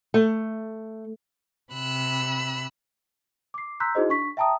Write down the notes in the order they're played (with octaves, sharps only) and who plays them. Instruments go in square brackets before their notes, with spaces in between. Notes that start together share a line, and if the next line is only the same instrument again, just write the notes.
[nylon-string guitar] A3
[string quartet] C3 B5 E6 F#6
[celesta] D6 C7
A#5 C6 E6 F#6 G6 B6
D#4 E4 F#4 G#4 C5 D#5
D4 C#6 B6
E5 G5 A5 A#5 D#6